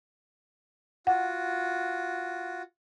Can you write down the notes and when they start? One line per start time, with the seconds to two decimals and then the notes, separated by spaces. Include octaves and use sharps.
1.07 F4 F#4 F#5